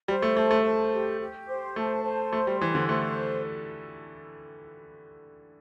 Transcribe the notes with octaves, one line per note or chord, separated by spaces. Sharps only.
G3 C5
A3
A3 A5
A3
C5
G4
G4
C5
A3 A5
C5
A3 C6
G3
E3 C5
D3
A3 C5